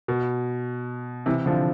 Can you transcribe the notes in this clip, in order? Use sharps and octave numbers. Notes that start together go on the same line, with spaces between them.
B2
C3 E3
D3 F3